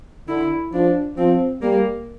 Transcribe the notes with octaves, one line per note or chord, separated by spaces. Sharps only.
D3 E4
F3 D4
F3 C4
G3 A#3